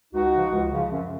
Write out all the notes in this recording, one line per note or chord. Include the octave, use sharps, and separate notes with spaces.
C#2 D#4 F#4
C#3 F3
C#2
C#3 F3
F#2